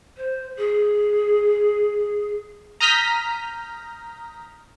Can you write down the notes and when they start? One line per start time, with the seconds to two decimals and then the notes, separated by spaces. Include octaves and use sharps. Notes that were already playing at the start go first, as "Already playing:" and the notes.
0.17 C5
0.56 G#4
2.81 A#5 D#6 F6 G6 A#6 B6